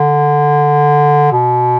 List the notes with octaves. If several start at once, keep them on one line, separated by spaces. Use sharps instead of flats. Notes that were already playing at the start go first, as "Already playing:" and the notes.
Already playing: D3
B2